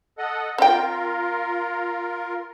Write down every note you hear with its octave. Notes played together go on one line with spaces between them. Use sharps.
A4 D#5 F#5
C4 F4 A#4 G5